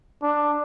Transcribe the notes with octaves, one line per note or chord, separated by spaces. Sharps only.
D4